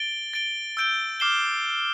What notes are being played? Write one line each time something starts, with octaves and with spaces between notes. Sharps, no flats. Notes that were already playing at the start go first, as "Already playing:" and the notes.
Already playing: A6 D7 G7
A6 D7 G7
E6 G6 D7 G7
D6 F6 C7 E7 G7